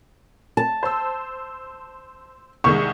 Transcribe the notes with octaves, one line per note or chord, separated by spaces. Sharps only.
A5
C5 E6
C2 D#3 G#3 C#6